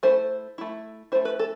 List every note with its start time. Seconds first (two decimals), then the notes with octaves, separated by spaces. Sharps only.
0.03 A3 E4 C5
0.58 A3 E4
1.12 E4 C5
1.15 A3
1.25 B4
1.39 A4